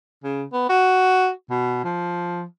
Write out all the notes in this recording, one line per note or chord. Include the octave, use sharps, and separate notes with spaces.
C#3
B3
F#4
B2
F3